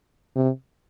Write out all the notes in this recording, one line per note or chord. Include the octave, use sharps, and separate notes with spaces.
C3